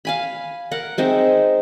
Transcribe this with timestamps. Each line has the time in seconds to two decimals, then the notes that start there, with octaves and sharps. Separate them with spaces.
0.05 F5 G#5 B5
0.71 A#4 F#5
0.98 G#3 C4 D#4 E5